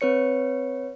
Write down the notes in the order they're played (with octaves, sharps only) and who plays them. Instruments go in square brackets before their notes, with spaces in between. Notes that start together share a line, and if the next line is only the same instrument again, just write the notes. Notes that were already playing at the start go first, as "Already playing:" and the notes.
[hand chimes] C4 B4 C#5 C#7